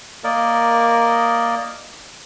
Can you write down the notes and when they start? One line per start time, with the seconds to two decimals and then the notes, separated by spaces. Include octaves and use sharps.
0.24 A#3 A#4 D5 D#5